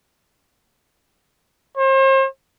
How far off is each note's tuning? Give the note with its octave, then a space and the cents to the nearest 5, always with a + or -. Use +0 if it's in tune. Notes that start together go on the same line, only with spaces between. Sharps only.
C5 +40